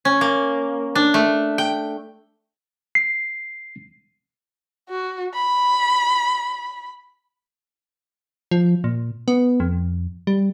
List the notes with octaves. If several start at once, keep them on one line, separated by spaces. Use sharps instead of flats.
C#4
A#3
D4
A3
G5
C7
F#4
B5
F3
A#2
B3
F2
G3